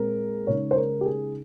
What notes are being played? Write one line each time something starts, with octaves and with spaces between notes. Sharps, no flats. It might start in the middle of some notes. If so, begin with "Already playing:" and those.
Already playing: A#2 G#3 C4 A#4
C#3 G#3 D#4 C#5
C5
A#4
G4
G#4